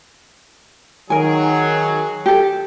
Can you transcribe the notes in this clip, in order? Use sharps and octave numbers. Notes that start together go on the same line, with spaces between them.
D#3 F#3 G#4 A#4 G#5
G4 A4